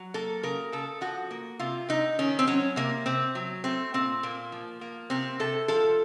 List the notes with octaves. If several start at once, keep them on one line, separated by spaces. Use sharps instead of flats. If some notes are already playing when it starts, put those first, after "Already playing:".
Already playing: F#3
A#3 A4
C#3 A#4
C#3 A4
F3 F#4
A#3
C3 F4
C3 D#4
D#3 C#4
C4
F#3 C#4
C3 A#3
C3 C4
F#3
A3 C4
A#2 C4
A#2 A#3
F3
A#3
C3 C4
C3 A4
F3 A4